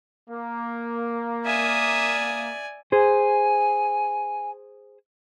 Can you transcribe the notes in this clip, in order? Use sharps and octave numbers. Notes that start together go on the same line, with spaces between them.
A#3
D5 E5 G#5 D#6
G#4 C5 G#5